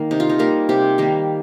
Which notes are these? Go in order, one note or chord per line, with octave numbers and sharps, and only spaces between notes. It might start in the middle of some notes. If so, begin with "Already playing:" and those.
Already playing: D#3 A#3
C3 D#4
F4
D#4
G3 A#3 A#4
C3 G4
D#3 G3 A#3